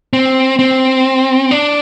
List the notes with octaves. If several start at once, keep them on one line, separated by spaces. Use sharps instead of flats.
C4
C4
D4